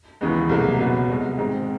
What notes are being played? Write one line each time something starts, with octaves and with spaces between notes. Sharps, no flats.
D#2 C#3 E3 G#3 B3
C2 B2 F#3 A#3
C#2 B2 F#3 B3
C2 B2 G#3
G#2 D#3 G#3 C4